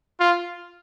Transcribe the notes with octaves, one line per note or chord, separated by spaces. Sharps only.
F4